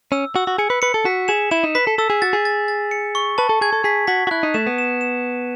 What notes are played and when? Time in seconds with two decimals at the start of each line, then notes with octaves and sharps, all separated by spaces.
0.12 C#4 E6
0.36 F#4 E6
0.47 F#4
0.58 G#4 C#7
0.70 B4
0.82 B4 C#7
0.94 A4
1.05 F#4 B6
1.28 G#4 E7
1.51 E4 E7
1.64 D#4
1.75 B4 B6
1.87 A4
1.98 A4 E6
2.10 G#4
2.22 F#4 A6
2.33 G#4
2.45 A6
2.68 A6
2.91 C#7
3.15 C#6
3.38 B4 A5
3.49 A4
3.61 G#4 G#6
3.73 A4
3.84 G#4 B6
4.07 F#4 B6
4.27 F#4
4.31 E4 F#6
4.43 D#4
4.54 A3 E7
4.67 B3
4.78 E7
5.01 E7